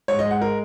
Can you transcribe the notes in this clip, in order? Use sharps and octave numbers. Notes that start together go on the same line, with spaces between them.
G#2 C#5
D#5
G#3
F#5
A#4